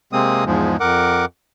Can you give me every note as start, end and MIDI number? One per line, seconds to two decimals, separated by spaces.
0.13 0.44 48
0.13 0.44 56
0.13 0.44 58
0.13 0.44 60
0.13 0.44 87
0.46 0.77 40
0.46 0.77 44
0.46 0.77 53
0.46 0.77 56
0.80 1.25 41
0.80 1.25 70
0.80 1.25 78
0.80 1.25 86